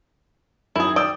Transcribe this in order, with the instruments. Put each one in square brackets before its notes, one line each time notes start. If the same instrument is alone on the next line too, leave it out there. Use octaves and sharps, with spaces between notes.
[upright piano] F#2 D#3 [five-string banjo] E4 G#4
[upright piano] D5 D#6 E6 [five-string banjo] G5